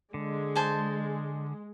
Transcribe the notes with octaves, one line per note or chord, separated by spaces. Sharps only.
D3 G#3
C5 G#5 A5